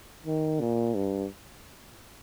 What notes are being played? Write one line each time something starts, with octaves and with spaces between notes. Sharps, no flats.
D#3
A#2
G2